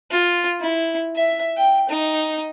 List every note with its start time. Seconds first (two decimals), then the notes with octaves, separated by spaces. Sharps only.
0.11 F4
0.61 E4
1.16 E5
1.57 G5
1.90 D#4